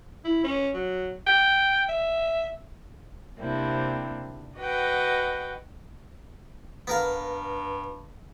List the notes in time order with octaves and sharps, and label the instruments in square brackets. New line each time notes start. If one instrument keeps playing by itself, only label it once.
[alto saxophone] E4
C#4
F#3
G5
E5
[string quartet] C3 G3 A#3 C4 D4 E4
F#4 B4 D#5 F#5 G5
[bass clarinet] G2 [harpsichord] B3 A#4 F5